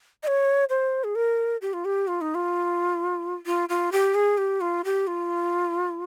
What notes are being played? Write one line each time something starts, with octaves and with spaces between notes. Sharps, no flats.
D#5
C#5
C5
G#4
A#4
G4
F4
G4
F4
D#4
F4
F4
F4
G4
G#4
G4
F4
G4
F4